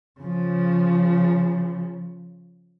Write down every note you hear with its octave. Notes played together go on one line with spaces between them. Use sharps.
C#3 F3